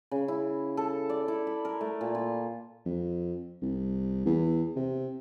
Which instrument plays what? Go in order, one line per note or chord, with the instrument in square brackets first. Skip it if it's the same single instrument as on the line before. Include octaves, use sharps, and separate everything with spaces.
[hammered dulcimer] C#3
E4
A4
D5
E4
B5
A#4
A3
A#2
F4
[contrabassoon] F2
C2
E2
C3